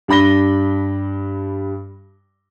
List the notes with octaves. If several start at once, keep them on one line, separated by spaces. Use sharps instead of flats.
G2 D4 B5 A#6 G7